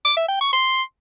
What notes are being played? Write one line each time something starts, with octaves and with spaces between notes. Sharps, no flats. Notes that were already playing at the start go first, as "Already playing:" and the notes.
D6
E5
G5
C#6
C6